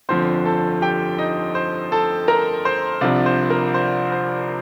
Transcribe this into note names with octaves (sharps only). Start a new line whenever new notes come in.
G1 F2 D3 F3 C4 C5 C6
A4 A5
G4 G5
D#4 D#5
C5
A4 A5
A#4 A#5
C5 C6
C2 C3 F3 D4 D5
C5
A#4
C5
C5